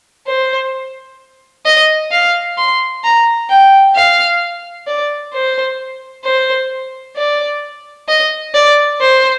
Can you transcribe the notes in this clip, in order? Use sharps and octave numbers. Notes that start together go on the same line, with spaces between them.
C5
D#5
F5
C6
A#5
G5
F5
D5
C5
C5
D5
D#5
D5
C5